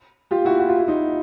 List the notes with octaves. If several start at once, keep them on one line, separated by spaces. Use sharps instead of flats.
F4 G4
E4 F#4
F#4
F4
E4
D#4 F4